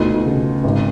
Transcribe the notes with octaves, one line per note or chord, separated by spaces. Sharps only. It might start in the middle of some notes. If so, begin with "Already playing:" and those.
Already playing: D2 B2 D#4 F4
C#3
G#1